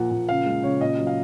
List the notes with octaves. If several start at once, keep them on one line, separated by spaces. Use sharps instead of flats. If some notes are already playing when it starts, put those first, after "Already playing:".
Already playing: A#2 F3 F#5
A#2
C#3 F5
G#3
C#3 C#5
A#2 D#5
F#3
F5